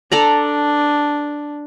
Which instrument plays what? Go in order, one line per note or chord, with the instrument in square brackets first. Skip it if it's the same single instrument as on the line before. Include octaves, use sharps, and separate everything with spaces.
[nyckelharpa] D4 [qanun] A4 D5 A#5